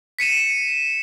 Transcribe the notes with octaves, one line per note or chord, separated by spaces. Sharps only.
B6 C#7 D#7 E7